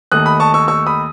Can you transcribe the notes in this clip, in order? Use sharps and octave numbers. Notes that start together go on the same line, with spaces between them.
D#2 D#3 A3 D#6 F#6
B5 D#6
A5 C#6
C#6 E6
C#6 E6
B5 D#6